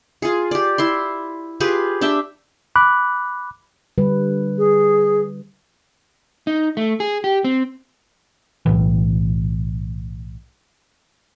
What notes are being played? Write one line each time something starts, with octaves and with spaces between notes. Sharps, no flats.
F4 G#4
G4 D5
E4 E5 C6
F4 G4 G#4 B4
D4 G4 E5 G5
B5 D6 F#6
D3 G3 B4
G#4
D#4
A3
G#4
G4
C4
B1 A2 E3